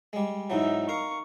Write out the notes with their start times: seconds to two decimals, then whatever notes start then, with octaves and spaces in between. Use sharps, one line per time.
0.13 G3 G#3
0.50 G#2 E3 F#3 D#4 E5
0.89 A#4 F5 C#6